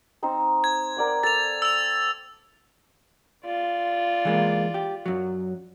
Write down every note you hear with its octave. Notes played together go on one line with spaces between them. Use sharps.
C4 D#4 C5
G#6
A#4 D5 F#5
A4 A6 F7
E6 F7
F4 D5
E3 G#3 A#3
G4
F#2 F#3